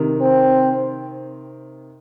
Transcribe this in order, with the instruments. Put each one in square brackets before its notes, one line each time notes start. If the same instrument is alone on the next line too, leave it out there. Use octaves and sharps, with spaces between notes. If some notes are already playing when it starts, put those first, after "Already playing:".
Already playing: [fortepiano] C3 D#3
[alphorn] C4